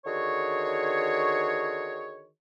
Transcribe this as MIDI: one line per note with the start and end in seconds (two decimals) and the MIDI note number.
0.05 2.28 50
0.05 2.28 51
0.05 2.28 66
0.05 2.28 68
0.05 2.28 73